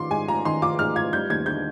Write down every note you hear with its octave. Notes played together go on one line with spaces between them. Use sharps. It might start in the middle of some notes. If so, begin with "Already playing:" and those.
Already playing: D#3 F4 C6 D6
G#2 G#5
F4 A#5
D#3 C6
F4 D6
G#2 F6
F4 G#6
G3 G6
D#2 G#6
D3 G6